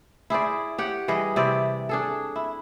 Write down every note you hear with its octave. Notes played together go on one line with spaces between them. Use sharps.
E4 G#4 C5 D5
G4 C#5 F#5
E3 G3 G#4 D#5
C3 C4 E4 D5
D4 G#4 A4
E4